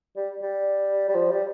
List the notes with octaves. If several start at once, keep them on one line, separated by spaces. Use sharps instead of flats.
G3
G3
G3
F3
G3